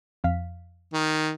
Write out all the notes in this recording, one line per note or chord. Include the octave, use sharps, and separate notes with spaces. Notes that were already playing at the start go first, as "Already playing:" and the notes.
F2 F5 B6
D#3